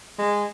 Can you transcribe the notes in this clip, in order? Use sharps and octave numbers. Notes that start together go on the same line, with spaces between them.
G#3